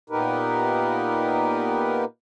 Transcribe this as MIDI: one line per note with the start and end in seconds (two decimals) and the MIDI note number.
0.10 2.05 46
0.10 2.05 59
0.10 2.05 63
0.10 2.05 67
0.10 2.05 70
0.10 2.05 71